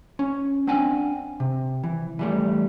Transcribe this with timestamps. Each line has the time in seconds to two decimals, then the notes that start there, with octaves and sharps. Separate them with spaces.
0.19 C#4
0.67 C4 D4 F#5 G#5
1.40 C3
1.83 E3
2.19 E3 G3 A3